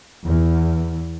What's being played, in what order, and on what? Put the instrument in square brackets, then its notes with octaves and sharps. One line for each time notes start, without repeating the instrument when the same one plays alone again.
[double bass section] E2